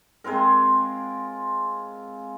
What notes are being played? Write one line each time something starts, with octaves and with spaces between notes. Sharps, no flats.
G#3 C4 F4 A#4